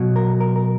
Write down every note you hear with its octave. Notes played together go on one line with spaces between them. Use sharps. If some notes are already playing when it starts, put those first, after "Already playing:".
Already playing: B2 F#3
A#4
A#4
A#4